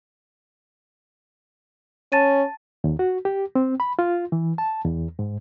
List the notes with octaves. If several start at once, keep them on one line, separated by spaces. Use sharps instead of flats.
C#4 A5 A6 D#7
D#2
F#4
G4
C4
B5
F4
E3
A5
E2
G#2